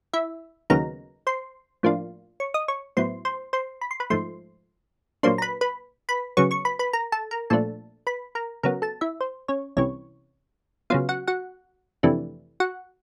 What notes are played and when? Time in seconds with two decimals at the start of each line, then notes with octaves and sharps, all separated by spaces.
0.13 E4 E5
0.70 D#2 C#3 F#3 B3 D#4 A#4 A#5
1.27 C5 C6
1.83 A2 F3 A#3 D4 F4
2.40 C#5 C#6
2.54 D#5 D#6
2.68 C#5 C#6
2.97 A2 F#3 B3 E4 C5 C6
3.25 C5 C6
3.53 C5 C6
3.81 B5
3.91 C6
4.00 B4 B5
4.10 G#2 F3 A3 C5 C6
5.23 A#2 F#3 A#3 D4 C5 C6
5.38 A#5
5.42 B4 B5
5.61 B4 B5
6.09 B4 B5
6.37 C#3 F#3 B3 C#5 C#6
6.51 C#5 C#6
6.65 B4 B5
6.79 B4 B5
6.93 A#4 A#5
7.12 A4 A5
7.31 A#4 A#5
7.50 A#2 F3 A3 D4 A4 A5
8.07 B4 B5
8.35 A#4 A#5
8.63 C#3 F#3 B3 A#4 A#5
8.82 A4 A5
9.01 E4 E5
9.21 C5
9.48 C#4 C#5
9.77 C2 C3 E3 C#4 C#5
10.90 C#3 F#3 B3 F4 F5
11.09 F#4 F#5
11.27 F#4 F#5
12.03 F2 C3 E3 A3 D4
12.60 F#4 F#5